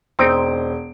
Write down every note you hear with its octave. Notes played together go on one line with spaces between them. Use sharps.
E1 C4 D#4 C5 D7